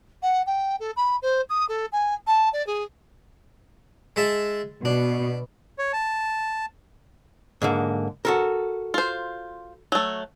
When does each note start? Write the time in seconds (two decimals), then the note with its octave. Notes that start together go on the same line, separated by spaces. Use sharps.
0.22 F#5
0.46 G5
0.80 A4
0.96 B5
1.22 C5
1.49 D#6
1.69 A4
1.92 G#5
2.27 A5
2.53 D5
2.67 G#4
4.16 G#3 E5 A5
4.85 B2 D4
5.78 C#5
5.93 A5
7.62 G#2 D3 A#3
8.25 F#4 A4 A#4
8.94 F4 C5
9.92 F#3 A3